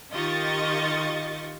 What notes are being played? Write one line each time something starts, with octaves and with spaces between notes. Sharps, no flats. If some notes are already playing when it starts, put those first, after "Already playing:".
D#3 F4 G4 D#5 C#6 A6